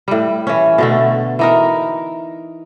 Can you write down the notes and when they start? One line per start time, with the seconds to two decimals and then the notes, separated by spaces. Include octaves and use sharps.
0.08 A2 G3
0.47 E3 C#4
0.78 B2 D3 A3
1.39 E3 D#4 A#4